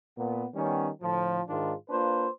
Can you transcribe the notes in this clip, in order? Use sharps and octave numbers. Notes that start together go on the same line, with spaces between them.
A#2 A#3 B3
D#3 G3 B3 C#4
A2 D3 F3
G#2 D#3 G#3 D4 F4
A#3 D4 F4 B4 C5